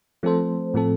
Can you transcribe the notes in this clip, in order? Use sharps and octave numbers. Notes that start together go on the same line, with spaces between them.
F3 A3 C4 A4 C5
A2 F3 C4 A4